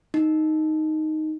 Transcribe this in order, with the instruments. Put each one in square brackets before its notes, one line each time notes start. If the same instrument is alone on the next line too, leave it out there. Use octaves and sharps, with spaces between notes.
[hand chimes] D#4